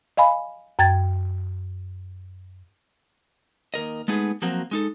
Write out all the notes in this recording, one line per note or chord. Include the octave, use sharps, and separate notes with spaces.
D#5 F5 G#5 B5
F#2 G5 G#6 A6
D#2 A#4 D#5
G#3 A3 B3 D#4 G#4
F3 F#3 A#3 C4 F#4
G#3 D#4 A4